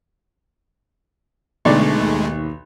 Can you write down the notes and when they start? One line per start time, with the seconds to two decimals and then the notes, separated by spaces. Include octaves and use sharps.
1.65 B1 D3 G#3 A3 D#4 D5 C#6
2.00 D#2